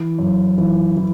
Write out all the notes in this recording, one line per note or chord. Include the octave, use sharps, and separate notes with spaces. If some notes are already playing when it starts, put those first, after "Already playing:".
Already playing: E3
F#2
E3
E3